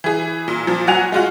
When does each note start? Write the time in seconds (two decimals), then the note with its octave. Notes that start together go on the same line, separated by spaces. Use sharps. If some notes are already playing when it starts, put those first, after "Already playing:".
0.04 E3 G#4
0.48 A#2
0.67 A#2 F3
0.87 F#3 F#5 G#5 F7
1.12 G#3 F4 F#4